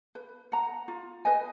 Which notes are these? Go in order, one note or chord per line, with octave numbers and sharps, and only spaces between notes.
B4
F#5 A#5
F4
B4 D#5 G#5